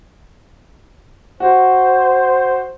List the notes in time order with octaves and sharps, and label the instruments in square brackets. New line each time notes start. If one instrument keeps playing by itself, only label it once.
[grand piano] F#4 [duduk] C5